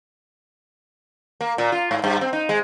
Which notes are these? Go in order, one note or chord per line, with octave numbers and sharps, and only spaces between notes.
A#3
A#2
F4
G#2
G2
C4
D#4
G#3